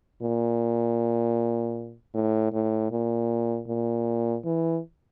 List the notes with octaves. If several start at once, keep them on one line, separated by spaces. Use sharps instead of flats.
A#2
A2
A2
A#2
A#2
E3